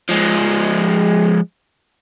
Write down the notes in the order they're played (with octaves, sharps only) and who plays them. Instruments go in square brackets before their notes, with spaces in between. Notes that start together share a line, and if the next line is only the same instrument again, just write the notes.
[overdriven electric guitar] F3 G#3